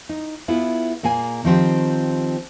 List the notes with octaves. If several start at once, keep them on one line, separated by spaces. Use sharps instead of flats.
D#4
B3 E4 F4 G#4
A#2 A#3 G#4 G#5
D#3 F3 C4 G4